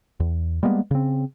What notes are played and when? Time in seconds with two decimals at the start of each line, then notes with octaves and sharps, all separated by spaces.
0.20 E2
0.63 G3 G#3 A#3 B3
0.91 C#3 C4